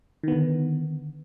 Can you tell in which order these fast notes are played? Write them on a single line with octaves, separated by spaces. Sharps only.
D#3 B3 D3